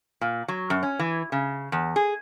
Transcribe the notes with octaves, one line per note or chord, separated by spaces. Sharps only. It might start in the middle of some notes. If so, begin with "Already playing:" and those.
A#2
F#3
F#2
C#4
E3
C#3
E2
G#4